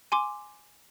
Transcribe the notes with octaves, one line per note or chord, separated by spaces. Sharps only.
G#5 C6 D6